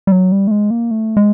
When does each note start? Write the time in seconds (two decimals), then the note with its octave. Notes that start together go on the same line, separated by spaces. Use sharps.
0.07 G3
0.12 F#3
0.32 G3
0.47 A3
0.51 G#3
0.71 A#3
0.91 A3
1.17 G#3